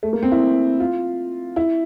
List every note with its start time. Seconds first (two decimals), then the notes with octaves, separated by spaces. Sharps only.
0.03 A3
0.13 A#3
0.23 C4
0.32 E4
0.80 F4
1.56 E4